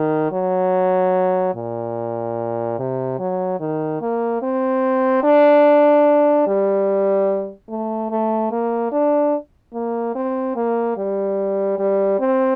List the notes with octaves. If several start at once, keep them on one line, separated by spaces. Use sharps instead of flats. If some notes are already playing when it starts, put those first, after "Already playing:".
Already playing: D#3
F#3
A#2
C3
F#3
D#3
A#3
C4
D4
G3
A3
A3
A#3
D4
A#3
C4
A#3
G3
G3
C4